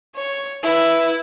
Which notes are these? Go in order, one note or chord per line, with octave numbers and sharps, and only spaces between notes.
C#5
E4 B4